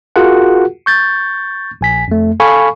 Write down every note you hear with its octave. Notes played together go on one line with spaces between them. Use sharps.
F4 F#4 G#4 A#4 F#5
C#6 G6 A6
A#1 G#5 B6
F2 A3
A4 F5 G#5 B5 C#6